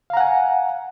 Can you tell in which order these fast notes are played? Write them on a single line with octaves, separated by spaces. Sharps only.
F5 A#5 F#5 G#5